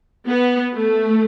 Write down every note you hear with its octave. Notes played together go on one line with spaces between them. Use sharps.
B3
A3